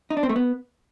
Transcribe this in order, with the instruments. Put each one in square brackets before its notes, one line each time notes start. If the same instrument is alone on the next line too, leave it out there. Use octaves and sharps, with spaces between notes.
[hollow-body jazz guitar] D#4
D4
C4
A3
B3